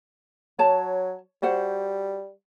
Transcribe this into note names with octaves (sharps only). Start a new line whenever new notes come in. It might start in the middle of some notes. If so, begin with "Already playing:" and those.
F#3 C#5 A5
G3 F#4 C5 F#5